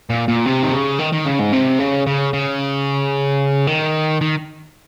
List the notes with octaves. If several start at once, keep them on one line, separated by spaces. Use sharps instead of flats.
A#2
A#2
C3
D#3
C#3
D#3
D#3
C#3
G#2
C3
C#3
C#3
C#3
D#3
D#3